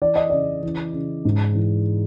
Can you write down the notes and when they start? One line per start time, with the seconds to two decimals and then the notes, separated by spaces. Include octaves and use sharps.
0.02 E3 D5
0.16 D#5
0.30 C#3 D5
0.63 E3
0.93 C#3
1.25 G#2
1.55 E3